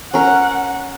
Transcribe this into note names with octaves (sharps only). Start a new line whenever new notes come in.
C#4 A#4 F#5